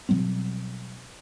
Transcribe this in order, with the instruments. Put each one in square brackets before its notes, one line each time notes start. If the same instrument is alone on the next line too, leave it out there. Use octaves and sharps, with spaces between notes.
[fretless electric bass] B2 F#3 G3 C4